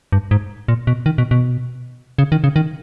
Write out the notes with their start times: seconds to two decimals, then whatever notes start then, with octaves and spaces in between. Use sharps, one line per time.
0.12 G2
0.31 G#2
0.68 A#2
0.87 B2
1.06 D#3
1.18 B2
1.31 B2
2.19 C#3
2.32 D#3
2.44 C#3
2.56 D#3